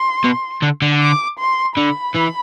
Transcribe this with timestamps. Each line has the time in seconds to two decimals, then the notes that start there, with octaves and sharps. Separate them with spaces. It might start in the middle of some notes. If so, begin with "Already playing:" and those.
Already playing: C6
0.24 B2
0.63 D3
0.82 D3
1.01 D6
1.39 C6
1.77 D3 B5
2.15 E3